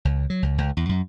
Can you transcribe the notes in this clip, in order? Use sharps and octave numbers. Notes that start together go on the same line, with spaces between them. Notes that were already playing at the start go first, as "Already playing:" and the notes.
C#2
F#3
C#2
C#2
E2
F#2